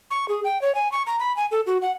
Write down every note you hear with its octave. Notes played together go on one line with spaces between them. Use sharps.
C#6
G#4
G5
C#5
G#5
C#6
A#5
B5
G#5
A4
F#4
F#5